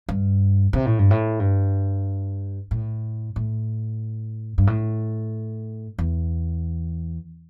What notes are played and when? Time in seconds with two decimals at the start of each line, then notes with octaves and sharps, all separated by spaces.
0.09 G2
0.73 C3
0.86 A2
0.99 G2
1.11 A2
1.40 G2
2.71 A2
3.36 A2
4.58 G2
4.67 A2
5.98 E2